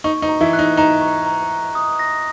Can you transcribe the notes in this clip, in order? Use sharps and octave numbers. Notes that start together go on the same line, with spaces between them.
D#4 C#6
D#4
A#5
E3 E4
F#6
D#4
D#4 A#5
C#6
A#5
F#6
D#6
A#6